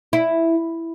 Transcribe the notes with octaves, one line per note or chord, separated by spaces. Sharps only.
E4